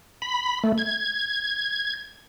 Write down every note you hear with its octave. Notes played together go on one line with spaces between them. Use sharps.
B5
A3
G#6